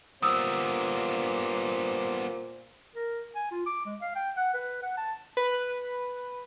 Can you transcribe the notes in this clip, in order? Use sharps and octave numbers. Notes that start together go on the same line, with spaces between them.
A#2 G3 B3 C5 D#6 E6
A#4
G#5
F4
D6
G#3
F5
G5
F#5
B4
F#5
A5
B4